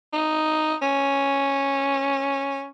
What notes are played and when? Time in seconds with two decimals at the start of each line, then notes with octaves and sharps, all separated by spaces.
0.13 D#4
0.82 C#4